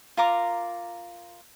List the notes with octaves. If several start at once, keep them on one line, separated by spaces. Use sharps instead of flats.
F4 A#4 A#5 D6